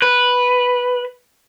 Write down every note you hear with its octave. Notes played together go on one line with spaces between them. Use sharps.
B4